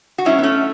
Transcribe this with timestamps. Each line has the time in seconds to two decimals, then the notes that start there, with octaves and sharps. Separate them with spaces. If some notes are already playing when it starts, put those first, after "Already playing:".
0.18 F#4
0.25 G#2 F#3 C#4 E4
0.38 B3
0.43 A3 C#4